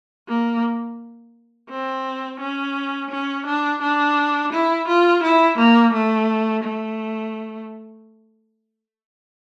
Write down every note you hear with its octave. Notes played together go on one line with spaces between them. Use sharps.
A#3
C4
C#4
C#4
D4
D4
E4
F4
E4
A#3
A3
A3